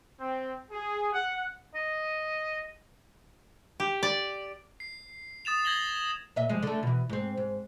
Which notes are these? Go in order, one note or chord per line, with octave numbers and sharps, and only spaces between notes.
C4
G#4
F#5
D#5
G4
D5
C7
D#6 A6 E7 F7
G#6 A#6 F#7 G7
A#2 D#5 E5
G2 F3 G#3
D3 A3
B2 E3
G#2 C4
G#2